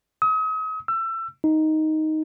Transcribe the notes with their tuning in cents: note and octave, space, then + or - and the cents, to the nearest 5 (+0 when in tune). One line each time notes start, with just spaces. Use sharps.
D#6 +40
E6 +25
D#4 +5